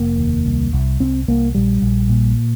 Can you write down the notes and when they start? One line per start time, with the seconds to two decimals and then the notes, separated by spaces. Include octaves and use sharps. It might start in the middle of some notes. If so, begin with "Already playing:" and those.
Already playing: F1 A#3
0.18 D#2
0.46 C2
0.73 C2
1.00 C2 C4
1.28 C2 A#3
1.55 A#1 G3
1.82 A#1
2.09 A#2